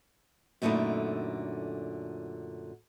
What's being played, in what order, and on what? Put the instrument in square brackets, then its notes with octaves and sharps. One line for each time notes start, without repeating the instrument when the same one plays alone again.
[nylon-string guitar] F#2 A#2 D3 A3 D#4 E4